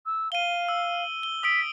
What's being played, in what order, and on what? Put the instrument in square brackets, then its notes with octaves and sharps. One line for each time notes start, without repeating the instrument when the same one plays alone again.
[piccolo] E6
[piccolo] F5 [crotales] D#7 G7
[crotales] E6
G7
[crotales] D#6 E6 D7 [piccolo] B6